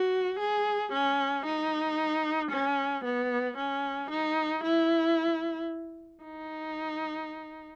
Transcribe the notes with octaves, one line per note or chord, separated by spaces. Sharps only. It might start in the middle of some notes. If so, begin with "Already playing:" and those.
Already playing: F#4
G#4
C#4
D#4
C#4
B3
C#4
D#4
E4
D#4